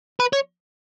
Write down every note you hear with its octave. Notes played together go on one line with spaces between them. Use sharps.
B4
C#5